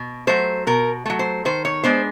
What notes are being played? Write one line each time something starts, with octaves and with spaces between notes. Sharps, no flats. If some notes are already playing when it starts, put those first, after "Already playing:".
Already playing: B2
F#3 A3 C5
B2 A#4
F#3 A3
C5
D#3 C5
C#5
G#3 B3 D4 C5